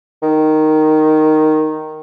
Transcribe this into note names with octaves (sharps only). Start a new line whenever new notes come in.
D#3